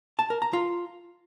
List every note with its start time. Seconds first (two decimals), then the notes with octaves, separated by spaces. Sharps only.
0.19 A5
0.30 A#4
0.42 A#5
0.53 F4